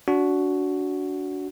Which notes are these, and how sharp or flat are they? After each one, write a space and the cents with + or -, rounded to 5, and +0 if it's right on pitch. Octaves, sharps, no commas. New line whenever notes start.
D4 -30 F#4 +0